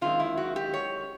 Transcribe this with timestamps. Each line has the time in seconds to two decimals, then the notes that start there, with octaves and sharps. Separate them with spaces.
0.01 F#2 D#3 G#3 C4 F4
0.20 E4
0.37 F#4
0.56 G4
0.74 C#5